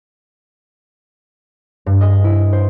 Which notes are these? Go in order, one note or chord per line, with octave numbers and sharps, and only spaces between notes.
G2
D#5
E4
C5